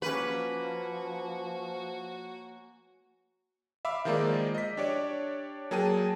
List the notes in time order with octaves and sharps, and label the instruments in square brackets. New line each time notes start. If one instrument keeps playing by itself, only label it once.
[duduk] F3 [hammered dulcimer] A#3 C#4 [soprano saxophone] F#4 [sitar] B4
[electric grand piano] E5 F5 B5 D6 E6
D#3 F3 G#3 A#3 D#4 D5
D#5 B6
D4 G4 C#5 D5
F#3 A#3 G#4 G5 A5 D#7